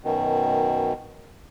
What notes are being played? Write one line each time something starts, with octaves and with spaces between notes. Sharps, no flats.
F#2 B2 D#3